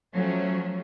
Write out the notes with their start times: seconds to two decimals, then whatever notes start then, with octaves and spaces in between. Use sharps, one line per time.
0.13 F3 F#3 A3 C#4